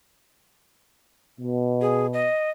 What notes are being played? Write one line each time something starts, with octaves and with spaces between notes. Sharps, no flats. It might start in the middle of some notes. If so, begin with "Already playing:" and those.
B2
G#4
D#5